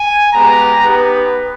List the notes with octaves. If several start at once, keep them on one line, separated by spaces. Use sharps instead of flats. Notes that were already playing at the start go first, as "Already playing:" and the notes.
Already playing: G#5
G#3 B3 G4 A#5
B3 D#4 G4 B4